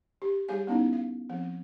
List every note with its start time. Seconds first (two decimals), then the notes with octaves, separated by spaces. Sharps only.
0.22 G4
0.48 G3 G4 G#4 C#5 F5 G#5
0.67 B3 C#4 D#4 E4
0.93 F5
1.29 F3 C4